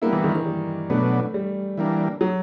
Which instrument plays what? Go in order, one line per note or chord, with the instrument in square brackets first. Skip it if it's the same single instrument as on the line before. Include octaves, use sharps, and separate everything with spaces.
[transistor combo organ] G3 B3 E4 [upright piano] A#3
[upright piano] E3
D#3
D#3
G3
[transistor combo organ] B2 F#3 B3 D4 [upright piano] A3
[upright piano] G3
[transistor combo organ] E3 G3 A#3 D4
[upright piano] F#3